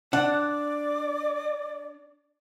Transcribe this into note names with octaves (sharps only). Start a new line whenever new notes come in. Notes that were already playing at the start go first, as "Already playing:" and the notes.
D4 D5 F#5